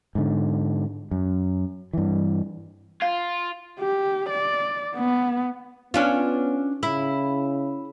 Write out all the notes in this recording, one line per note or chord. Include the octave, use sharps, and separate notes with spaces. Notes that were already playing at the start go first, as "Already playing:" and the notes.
G#2 D3
F#2
G2 E3
F4 F5
G4
D5
B3
B3 C#4 D4 F4
C#3 E4